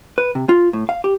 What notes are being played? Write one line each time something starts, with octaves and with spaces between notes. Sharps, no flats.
B4
C3
F4
A2
F5
G4